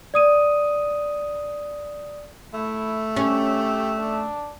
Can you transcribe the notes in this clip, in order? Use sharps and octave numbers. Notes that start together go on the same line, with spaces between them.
D5 D#6 D#7
A3 E4
C#4 G4
D4